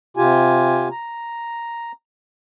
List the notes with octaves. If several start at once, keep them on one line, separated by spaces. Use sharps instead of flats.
C3 F4 G4 G#5
A#5